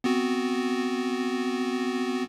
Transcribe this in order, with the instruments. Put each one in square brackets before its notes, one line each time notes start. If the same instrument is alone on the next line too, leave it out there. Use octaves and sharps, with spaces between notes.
[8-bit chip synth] B3 C4 F#4